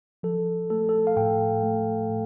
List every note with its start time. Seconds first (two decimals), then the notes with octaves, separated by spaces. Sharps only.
0.23 F3 A4
0.70 A3 A4
0.89 A4
1.07 F5
1.17 A2 G5
1.63 A3
2.09 A2